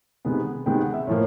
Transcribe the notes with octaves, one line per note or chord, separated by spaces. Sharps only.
C3 D#3 G#3 B3
C3 D#3 G#3 B3 G5
F#5
E5
A2 F3 A#3 C#5